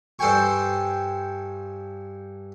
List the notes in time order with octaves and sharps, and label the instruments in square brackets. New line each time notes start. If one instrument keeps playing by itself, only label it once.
[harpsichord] G2 A4 C5 G5 G#5 C#6